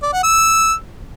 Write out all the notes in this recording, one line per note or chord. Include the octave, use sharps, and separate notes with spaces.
D5
F#5
E6